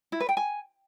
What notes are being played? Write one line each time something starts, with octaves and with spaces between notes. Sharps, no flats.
E4
B4
G5
G#5